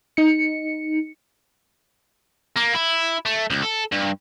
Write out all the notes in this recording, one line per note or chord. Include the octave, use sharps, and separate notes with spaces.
D#4 C#7
A#3
E4
A3
C#2
A4
G2